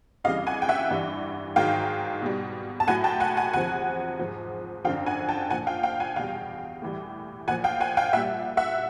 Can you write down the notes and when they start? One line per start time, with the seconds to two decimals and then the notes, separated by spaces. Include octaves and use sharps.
0.24 F2 C#3 E3 G3 D#5 F5
0.47 F#5 G#5
0.62 G5
0.69 E5 F#5
0.91 G2 E3 G3
1.56 G#2 D#3 F#3 F5 G5
2.22 B2 G3
2.80 A5
2.88 A2 F#3 F#5 G#5
3.04 G5 A5
3.20 F#5 G#5
3.37 F#5 G#5
3.53 E2 C3 F3 F#5 G#5
4.19 G#2 F3
4.84 F#2 D3 F3 F5 G5
5.06 F#5 G#5
5.29 G5 A5
5.50 A#2 F3 F#5 G#5
5.67 F5 G5
5.83 F5 G5
6.00 F#5 G#5
6.16 E2 B2 G3 F5 G5
6.82 A2 E3 G3
7.47 A#2 F#5 G#5
7.51 F3
7.64 F5 G5
7.80 F#5 G#5
7.97 F5 G5
8.13 A#2 E5 F#5
8.17 G3
8.57 E5 F#5